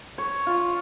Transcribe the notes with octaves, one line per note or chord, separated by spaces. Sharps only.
C#5
F4